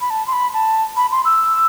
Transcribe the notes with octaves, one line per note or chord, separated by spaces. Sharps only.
B5
A5
C6
B5
A5
B5
C6
E6